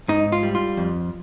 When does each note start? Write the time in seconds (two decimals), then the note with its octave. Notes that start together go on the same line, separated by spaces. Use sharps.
0.08 G#2 D#4
0.32 F4
0.43 G3
0.55 F4
0.77 F2